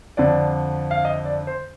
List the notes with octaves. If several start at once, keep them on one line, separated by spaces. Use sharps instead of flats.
F2 D3 D5
F5
D#5
D5
C5